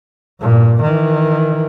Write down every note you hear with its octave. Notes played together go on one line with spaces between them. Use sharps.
G2 A#2
D#3 E3